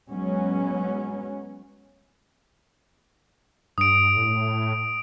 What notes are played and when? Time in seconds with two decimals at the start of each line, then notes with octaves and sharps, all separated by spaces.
0.10 F#3 G#3 B3 C#4
3.78 G2 D#6 D7
4.17 A2